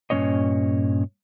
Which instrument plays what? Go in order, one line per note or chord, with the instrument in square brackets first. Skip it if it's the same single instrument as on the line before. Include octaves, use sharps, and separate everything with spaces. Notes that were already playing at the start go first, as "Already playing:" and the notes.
[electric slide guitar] G2 A#2 G3 C#4 C#5 D#5